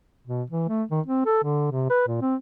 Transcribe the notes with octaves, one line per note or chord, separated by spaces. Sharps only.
B2
E3
A3
D#3
C4
A4
D3
C3
B4
A#2
C4